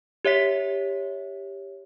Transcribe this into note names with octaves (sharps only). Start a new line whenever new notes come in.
G4 C#5 E5 B6